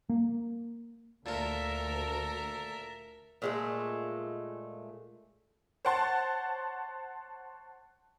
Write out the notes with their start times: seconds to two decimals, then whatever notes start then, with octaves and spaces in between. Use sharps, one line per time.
0.09 A#3
1.26 D2 A#2 F4 A4 A#4 E5 A5
3.42 A#2 G#3 A3
5.85 C5 C#5 F#5 A5 C6